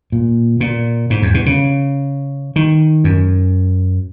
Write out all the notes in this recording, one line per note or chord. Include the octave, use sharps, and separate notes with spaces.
A#2
A#2
G#2
E2
B2
C#3
D#3
F#2